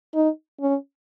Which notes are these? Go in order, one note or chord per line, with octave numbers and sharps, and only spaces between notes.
D#4
C#4